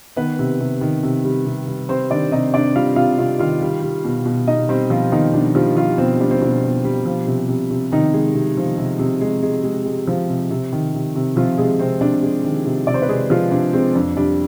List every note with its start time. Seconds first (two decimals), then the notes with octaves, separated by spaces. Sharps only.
0.16 D#3 B3 B4
0.39 C3
0.60 C3
0.81 D#3
1.03 C3
1.25 G3
1.46 C3
1.68 G3
1.89 G3 C4 C5
2.10 D#3 D4 D5
2.32 C3 D#4 D#5
2.54 C3 D4 D5
2.76 G3 F4 F5
2.96 C3 F4 F5
3.19 C3 F4 F5
3.39 D#3 F4 F5
3.62 G3
3.82 G3
4.05 B2
4.26 B2
4.47 B2 D#4 D#5
4.69 G3 C4 C5
4.90 B2 F3 F4
5.12 B2 D#3 D#4
5.34 B2 D4
5.55 F3 G3 F4
5.77 F3 G3 F4
5.98 B2 C4
6.20 G3 D4
6.31 C4
6.42 B2 D4
6.63 B2
6.85 G3
7.06 F3
7.27 C3
7.49 C3
7.71 C3
7.91 C3 D#3 D#4
8.13 G#3
8.35 C3
8.57 F3
8.78 C3
8.99 C3
9.21 G#3
9.43 G#3
9.64 G#3
9.85 G#3
10.07 F3
10.29 C3
10.51 C3
10.73 D#3
10.94 C3
11.16 C3
11.36 C3 F3 F4
11.57 C3 G#3 G#4
11.79 C3 C4
12.01 C3 D4
12.23 G#3
12.44 D#3
12.65 C3
12.87 C3 D5
12.94 C5
13.02 B4
13.08 C3 G#3 G#4
13.30 F3 G#3 F4
13.51 C3 D4
13.73 G#3 C4
13.94 F2 D4
14.17 G3 D4